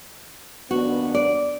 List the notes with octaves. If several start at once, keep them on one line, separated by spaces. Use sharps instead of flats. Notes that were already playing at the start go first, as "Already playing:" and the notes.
D#2 B3 D4 F#4
D5